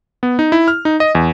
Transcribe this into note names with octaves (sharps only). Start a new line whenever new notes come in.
B3
D#4
E4
F6
D#4
D#5
E2